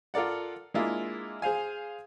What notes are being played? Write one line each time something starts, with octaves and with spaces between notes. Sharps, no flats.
F4 A4 A#4 D5 F#5
G#3 A#3 D4 E4 F4 G#4
G#4 C5 F5 G#5